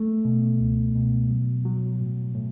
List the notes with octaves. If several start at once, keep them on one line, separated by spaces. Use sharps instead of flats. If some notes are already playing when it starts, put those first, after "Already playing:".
Already playing: A3
B2
C#2
B2
F#3
F#3
A2
A2